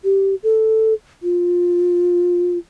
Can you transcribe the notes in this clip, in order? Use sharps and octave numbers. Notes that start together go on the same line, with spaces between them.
G4
A4
F4